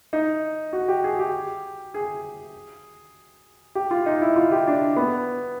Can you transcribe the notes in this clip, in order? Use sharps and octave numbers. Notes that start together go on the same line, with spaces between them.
D#4
F#4
G4
G#4
G4
G#4
G4
F4
D#4
E4
F4
G4
D4
B3